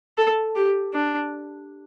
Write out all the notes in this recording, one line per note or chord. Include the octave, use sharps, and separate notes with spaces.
A4
G4
D4